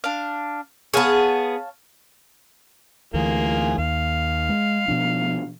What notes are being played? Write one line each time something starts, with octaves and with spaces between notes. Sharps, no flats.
D4 F5
B3 G#4 C#5 F5 A5
D2 E3 A3 A#3 F4 G#4
D#2 F5
G#3
B2 F3 D4